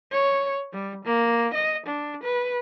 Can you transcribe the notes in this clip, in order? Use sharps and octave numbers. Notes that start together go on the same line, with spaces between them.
C#5
G3
A#3
D#5
D4
B4